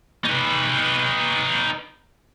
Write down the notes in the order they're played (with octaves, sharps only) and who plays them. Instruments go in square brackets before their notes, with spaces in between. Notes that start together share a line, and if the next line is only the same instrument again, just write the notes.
[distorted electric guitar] D#4 B4